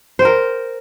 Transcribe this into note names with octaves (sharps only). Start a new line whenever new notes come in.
A#4 C5 G5